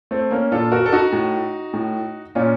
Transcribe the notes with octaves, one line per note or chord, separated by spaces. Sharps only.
A3 C4
A#3 C#4
A#2 F4 A4
F#4 A#4
A4
D#4 F#4
A2
A2
A#2 C#4 F4